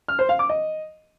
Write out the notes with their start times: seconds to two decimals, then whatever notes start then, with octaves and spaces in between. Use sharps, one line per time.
0.08 F6
0.19 C5
0.29 F5
0.39 D6
0.49 D#5